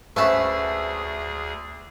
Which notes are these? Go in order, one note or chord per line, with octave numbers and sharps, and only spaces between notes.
D2 A3 C#4 G#4 B4 E5